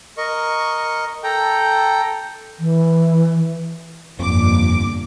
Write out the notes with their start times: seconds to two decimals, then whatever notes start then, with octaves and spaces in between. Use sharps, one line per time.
0.17 A#4 D#5 C#6
1.23 A4 G5 A#5
2.60 E3
4.19 G1 F2 A#2 D6